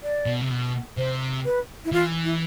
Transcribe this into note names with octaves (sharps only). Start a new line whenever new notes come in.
D5
B2
C3
B2
C3 C5
B4
E4
E3 F4
E4